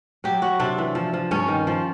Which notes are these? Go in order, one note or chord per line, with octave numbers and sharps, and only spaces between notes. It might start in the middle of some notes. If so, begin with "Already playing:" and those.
F#3 G4
F#3 F#4
C3 D4
E3
F3
F3
G2 C#4
D#3
F3